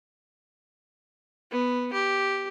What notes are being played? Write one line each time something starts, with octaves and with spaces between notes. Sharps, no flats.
B3
G4